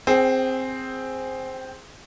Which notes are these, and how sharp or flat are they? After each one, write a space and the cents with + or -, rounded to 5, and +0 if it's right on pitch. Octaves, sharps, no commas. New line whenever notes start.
C4 +0 G#4 -10 G5 -30